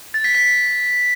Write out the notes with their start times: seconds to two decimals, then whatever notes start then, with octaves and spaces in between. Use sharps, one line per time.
0.14 A6
0.24 B6
0.35 B6